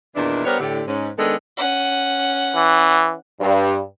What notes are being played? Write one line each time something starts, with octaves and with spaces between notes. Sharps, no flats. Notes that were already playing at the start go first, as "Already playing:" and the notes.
E2 A#2 D#3 E3 D4
G3 B3 D4 A#4 C5 C#5
A2 D3 G4
G#2 C#4
D#3 G#3 B3 D4 A4
C#4 F#5
E3
G2